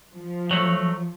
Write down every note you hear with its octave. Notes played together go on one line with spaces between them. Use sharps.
F3
F#3 A3